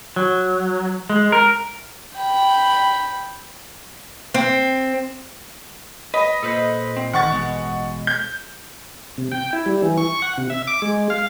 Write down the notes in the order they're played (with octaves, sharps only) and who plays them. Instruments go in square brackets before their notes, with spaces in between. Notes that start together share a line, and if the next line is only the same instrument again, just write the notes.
[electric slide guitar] F#3
G#3
A#4
[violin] G5 B5
[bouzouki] C4
[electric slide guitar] B4 [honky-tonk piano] D#5
[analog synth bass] A#2 [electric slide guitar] A4 B4 C5
[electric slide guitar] C4
[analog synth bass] A1 [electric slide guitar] D#3 [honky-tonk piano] F#5 C#6 A6
[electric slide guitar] B2 G#3
[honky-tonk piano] G6
[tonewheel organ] C3
G5
E4
G3
E3
C#6
F#5
C3
E5
D6
G#3
F5